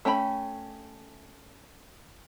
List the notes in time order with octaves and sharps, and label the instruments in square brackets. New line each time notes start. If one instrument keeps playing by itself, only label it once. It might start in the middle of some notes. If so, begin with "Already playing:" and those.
[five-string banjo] A3 C#4 G5 A#5 B5